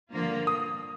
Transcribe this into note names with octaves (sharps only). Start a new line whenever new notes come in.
G2 D3 F3 A#3 F4
D#6